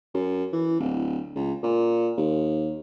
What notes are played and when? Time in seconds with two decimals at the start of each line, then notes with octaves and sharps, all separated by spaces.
0.14 F#2
0.53 E3
0.79 D1
1.36 C#2
1.63 A#2
2.17 D#2